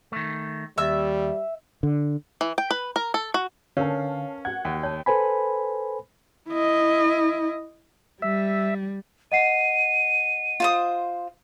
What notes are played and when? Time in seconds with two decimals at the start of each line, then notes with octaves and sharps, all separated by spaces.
0.12 D#3 A3
0.78 D#2 G3 E5 E6
1.83 D3
2.41 E3
2.58 G5
2.71 B4
2.96 A#4
3.14 A4
3.34 F#4
3.77 D3 C#4 A#4 B4 C#5 F5 A5
4.45 F#4 F#5 G#6
4.65 D#2
4.83 C#5 G5 A5
5.06 A4 B4 C5 G#5 B5
6.49 E4 D#5
8.22 G3 E5
9.32 D#5 F#5 C7 D#7
10.60 F4 C5 D#6